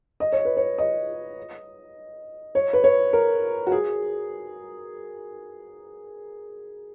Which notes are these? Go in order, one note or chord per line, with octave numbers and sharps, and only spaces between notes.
D#5
C#5
B4
C#5
D#5
C#5
B4
C#5
A#4
F#4
G#4